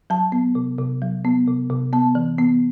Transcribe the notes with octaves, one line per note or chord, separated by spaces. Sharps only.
F#3 A5
B3
C3
C3
F#3
B3
C3
C3
B3 A5
E3
B3